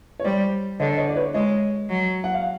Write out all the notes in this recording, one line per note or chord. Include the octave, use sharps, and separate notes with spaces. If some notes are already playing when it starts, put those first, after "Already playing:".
C#5
G3 C5 D5
D3 C#5 D#5
C#5 D#5
D5
B4 C#5
G#3 C#5 D#5
F#3
F#5
F5